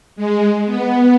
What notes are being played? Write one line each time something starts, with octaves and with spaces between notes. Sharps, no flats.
G#3
B3